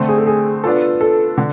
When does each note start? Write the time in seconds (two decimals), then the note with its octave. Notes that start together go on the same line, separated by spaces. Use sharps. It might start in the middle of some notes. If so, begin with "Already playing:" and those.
Already playing: D3 A3 C4
0.09 G#4
0.18 A4
0.27 G#4
0.64 B3 D4 F4 A4
1.01 A4
1.38 D3